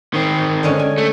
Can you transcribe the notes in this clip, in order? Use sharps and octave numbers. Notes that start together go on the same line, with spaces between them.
D#3 C4
D3 G#3 C#4
G#5
A3